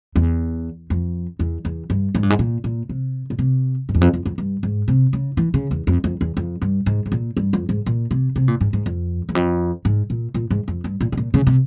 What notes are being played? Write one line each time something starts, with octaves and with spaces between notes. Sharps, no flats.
E2
F2
E2
E2
G2
G#2
G2
G#2
A#2
A#2
C3
A#2
C3
G#2
E2
F2
F2
F2
G2
G#2
C3
C#3
E3
C#3
E2
F2
F2
E2
F2
G2
G#2
G#2
A#2
G2
F2
G#2
A#2
C3
C3
A#2
G#2
G#2
F2
E2
F2
G#2
A#2
A#2
G#2
F2
G2
A#2
C3
A#2
C#3
C3